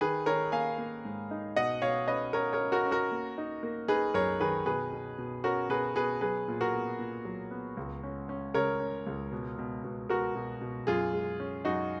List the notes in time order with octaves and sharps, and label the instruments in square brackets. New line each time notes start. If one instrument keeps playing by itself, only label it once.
[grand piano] D#3 G#4 B4
D#3 A#4 C#5
A#3 F5 G#5
A#3
G#2
D#4
B2 D#5 F#5
B2 C#5 F5
C#4 B4 D#5
C#4 A#4 C#5
A#4 C#5
C#4
F#4 A#4
C#4
F#4 A#4
A#3
D#4
A#3
D#4 G#4 B4
F#2 A#4 C#5
D#3 G#4 B4
B2 G#4 B4
B2
B2
C#4 F#4 A#4
B2 G#4 B4
B2 G#4 B4
F#3 G#4 B4
A#2
F#4 A#4
B3
A#2
F#3
B3
C#2
C#4
C#4
C#3 A#4 C#5
C#4
C#2
B2
B2
B2
B2 F#4 A#4
B2
B2
F#2 F4 G#4
G#3
C#4
F#2 D#4 F#4